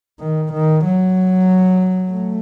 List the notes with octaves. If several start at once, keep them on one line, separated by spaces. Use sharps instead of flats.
D#3
D#3
F#3
A3